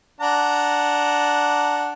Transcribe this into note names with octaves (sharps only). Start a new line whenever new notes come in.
D4 F#5 A#5